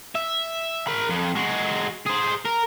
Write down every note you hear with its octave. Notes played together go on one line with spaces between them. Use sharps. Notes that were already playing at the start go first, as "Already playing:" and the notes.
E5
A#4 B5
F2 F3
G#3 F#4
G#4 C5
A#4